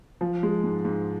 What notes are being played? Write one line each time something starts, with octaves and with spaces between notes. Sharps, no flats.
F3
G#3
G#2
G#2